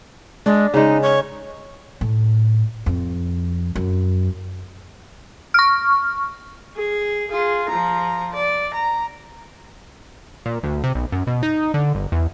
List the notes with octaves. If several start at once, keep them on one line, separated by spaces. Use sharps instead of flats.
G#3 D4
C#3 G#3 D#4
C#5
A2
F2
F#2
C#6 F6
G#4
F4 G#4
F3 A#5
D5
A#5
A#2
D2
C3
B1
F#2
B2
D#4
D3
G1
E2